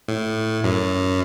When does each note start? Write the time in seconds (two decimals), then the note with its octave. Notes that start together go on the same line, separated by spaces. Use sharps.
0.08 A2
0.64 F#2